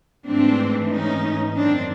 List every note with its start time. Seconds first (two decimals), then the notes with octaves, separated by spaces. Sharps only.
0.27 G#2 E3 A3 C4 D4
0.91 C#4 D#4
1.55 F#2 D#3 F#3 C4 D4